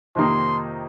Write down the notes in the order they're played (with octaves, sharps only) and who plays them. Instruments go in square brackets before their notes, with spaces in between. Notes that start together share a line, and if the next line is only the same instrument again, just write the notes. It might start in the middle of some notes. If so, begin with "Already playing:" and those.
[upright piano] F2 C3 D#3 A#3 D#4 [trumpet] C6